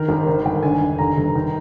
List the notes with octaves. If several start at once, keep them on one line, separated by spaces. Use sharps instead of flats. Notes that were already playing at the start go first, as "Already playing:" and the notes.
Already playing: D#3 A#4
G#1
D#3 C5
G1 G5
D3 G#5
F1
D3 A#5
G1
D#3